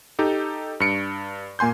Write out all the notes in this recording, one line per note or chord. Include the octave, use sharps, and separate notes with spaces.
D#4 G4 A4
G2 C#7 D7
A#2 A#3 G#5 C6 G6